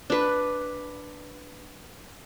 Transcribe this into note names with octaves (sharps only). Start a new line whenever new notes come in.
D4 B4